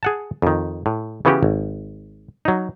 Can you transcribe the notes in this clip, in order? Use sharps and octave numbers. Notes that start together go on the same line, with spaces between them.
G#4 F#5 A5
F2 D#3
A2
C#3 E3 B3 C#4 F#4 G4
G#1
F#3 D#4